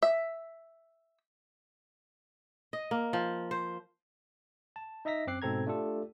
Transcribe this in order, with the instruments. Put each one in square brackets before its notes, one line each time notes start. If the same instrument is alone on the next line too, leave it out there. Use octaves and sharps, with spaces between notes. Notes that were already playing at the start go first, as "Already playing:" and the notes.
[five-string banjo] E5
[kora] D#5
A#3
F3
C5
[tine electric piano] A5
D#4 D#5 E5 A#5 A#6 B6
F#2 C4 D6 F#6 C7
G#2 B2 C4 A4 A#5 G#6
A3 D4 F4 G4 A4